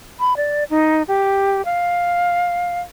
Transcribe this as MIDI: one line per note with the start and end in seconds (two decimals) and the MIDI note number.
0.20 0.36 83
0.37 0.64 74
0.70 1.03 63
1.08 1.64 67
1.65 2.80 77